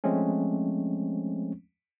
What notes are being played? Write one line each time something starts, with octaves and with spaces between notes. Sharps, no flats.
F3 G#3 A3 C4 C#4